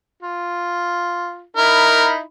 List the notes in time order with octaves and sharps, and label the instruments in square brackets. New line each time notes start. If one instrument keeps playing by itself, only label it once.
[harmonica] F4
[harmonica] D#4 E4 B5 [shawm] A#4